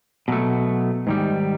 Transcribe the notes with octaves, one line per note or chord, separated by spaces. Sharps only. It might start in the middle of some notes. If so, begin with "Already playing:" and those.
B2 F#3 A3
G#2 D#3 G3